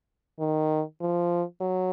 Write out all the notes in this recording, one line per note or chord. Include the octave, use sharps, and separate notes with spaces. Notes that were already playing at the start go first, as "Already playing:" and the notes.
D#3
F3
F#3